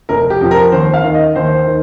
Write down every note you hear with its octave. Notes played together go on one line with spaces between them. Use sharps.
F1 A#4
G4
F2 F3
A#4
D#2 C5
F5
D#3
D#5
D#2 C5
D#3